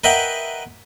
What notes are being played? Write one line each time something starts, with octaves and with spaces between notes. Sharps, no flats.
A#4 B4 D#5 E5 F#5 G5